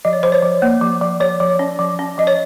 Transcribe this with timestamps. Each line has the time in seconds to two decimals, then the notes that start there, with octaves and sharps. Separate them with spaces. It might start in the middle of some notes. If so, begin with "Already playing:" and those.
0.05 F3 D#5
0.13 C#5
0.23 F3 C5
0.32 C#5
0.42 F3
0.62 A#3
0.81 F3
1.01 F3
1.20 F3 C#5
1.40 F3
1.59 C#4
1.79 F3
1.99 C#4
2.18 F3 D#5
2.27 C#5